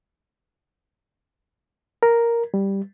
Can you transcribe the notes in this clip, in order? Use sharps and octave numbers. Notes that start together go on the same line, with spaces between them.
A#4
G3